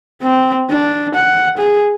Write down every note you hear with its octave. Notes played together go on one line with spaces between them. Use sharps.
C4
D4
F#5
G#4